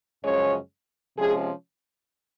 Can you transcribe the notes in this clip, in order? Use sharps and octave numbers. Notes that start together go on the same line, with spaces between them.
F#2 C#3 F3 G#3 C#4 C#5
C3 F3 G#3 C#4 G#4